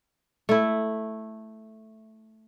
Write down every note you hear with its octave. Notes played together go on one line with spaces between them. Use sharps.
A3 E4